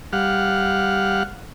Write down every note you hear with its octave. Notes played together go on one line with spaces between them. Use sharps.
G3 F5 F#5